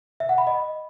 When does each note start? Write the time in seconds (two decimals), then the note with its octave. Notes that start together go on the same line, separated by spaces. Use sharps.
0.20 E5
0.29 F#5
0.38 B5
0.47 D#5